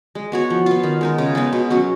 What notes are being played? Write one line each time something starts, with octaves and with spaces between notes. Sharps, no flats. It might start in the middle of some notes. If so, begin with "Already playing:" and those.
G#3
B3 F#4 C#5
F3
B3 F4
D#3
G#3 D#4 A#4
C#3
G#3 B3 D#4
B2
F#3 C#4 F#4